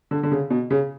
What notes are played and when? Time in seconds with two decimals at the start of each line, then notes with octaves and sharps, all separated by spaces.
0.11 D3
0.23 D3
0.31 C#3
0.50 B2
0.70 C#3